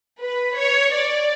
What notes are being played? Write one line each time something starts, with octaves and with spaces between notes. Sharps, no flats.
B4
C#5
D5